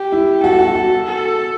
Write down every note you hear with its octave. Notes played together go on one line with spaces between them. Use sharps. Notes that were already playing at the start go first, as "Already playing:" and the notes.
Already playing: G4
E4
F#4 A4
F#4
F#4
A4